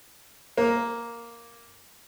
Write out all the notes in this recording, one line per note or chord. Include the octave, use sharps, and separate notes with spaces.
A#3